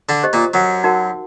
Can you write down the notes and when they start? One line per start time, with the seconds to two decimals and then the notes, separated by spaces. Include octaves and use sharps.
0.09 D3 D4
0.23 G4 C5 D#5
0.33 A#2 A#3
0.54 F#2 F#3
0.84 D#4 F#4 A#4 F#5